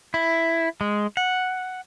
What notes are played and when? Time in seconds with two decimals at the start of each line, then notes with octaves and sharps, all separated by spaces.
0.14 E4
0.81 G#3
1.17 F#5